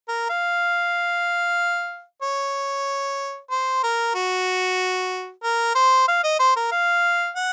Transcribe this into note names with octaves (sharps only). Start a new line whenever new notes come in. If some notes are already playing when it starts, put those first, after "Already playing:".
A#4
F5
C#5
C5
A#4
F#4
A#4
C5
F5
D#5
C5
A#4
F5
F#5